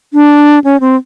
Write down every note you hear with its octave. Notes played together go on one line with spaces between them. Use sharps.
D4
C#4
C4